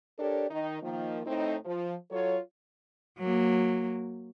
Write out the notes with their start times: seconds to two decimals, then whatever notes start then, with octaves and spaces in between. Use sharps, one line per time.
0.19 D4 G4 A4 A#4 C#5 D5
0.51 D#3 D#4
0.82 D#3 F3 A#3
1.26 A2 C4 D#4
1.65 F3
2.11 F#3 F4 A4 C#5
3.19 F#3 A#3